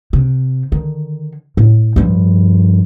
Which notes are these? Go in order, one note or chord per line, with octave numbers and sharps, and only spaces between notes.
C3
D3 D#3
A2
G2 F3